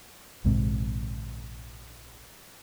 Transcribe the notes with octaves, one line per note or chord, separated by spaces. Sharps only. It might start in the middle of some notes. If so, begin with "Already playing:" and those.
A#1 D#2 G#2 C3